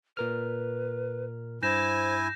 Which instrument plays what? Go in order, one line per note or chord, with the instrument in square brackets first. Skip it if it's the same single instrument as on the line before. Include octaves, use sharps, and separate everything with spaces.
[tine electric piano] A#2 A#4 F6 [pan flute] B4
[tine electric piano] G2 [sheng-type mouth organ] E4 G#5 [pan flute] C5 [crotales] G6 A#6 E7